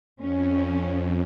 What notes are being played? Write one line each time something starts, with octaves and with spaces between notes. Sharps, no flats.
F2 C#4